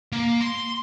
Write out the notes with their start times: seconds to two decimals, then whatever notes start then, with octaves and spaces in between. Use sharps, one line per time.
0.12 A#3
0.41 C6